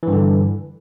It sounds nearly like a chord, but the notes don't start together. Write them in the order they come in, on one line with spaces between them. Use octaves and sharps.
E3 G2 D3